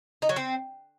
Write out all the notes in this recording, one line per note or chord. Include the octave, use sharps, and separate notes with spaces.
D#4
F#3
C4